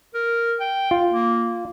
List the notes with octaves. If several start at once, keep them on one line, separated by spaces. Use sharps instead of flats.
A#4
G5
F4
A#3